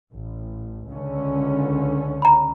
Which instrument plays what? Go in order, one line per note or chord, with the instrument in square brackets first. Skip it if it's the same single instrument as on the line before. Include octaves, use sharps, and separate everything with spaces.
[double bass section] A1
C#2 D3 C#4
[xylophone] A#5 B5